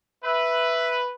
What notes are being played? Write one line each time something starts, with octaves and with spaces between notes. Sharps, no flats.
B4 E5